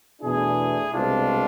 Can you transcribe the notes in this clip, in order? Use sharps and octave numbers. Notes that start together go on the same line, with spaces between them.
E2 B2 A3 D4 E4 G#4
C2 B2 G#3 C4 D4 F4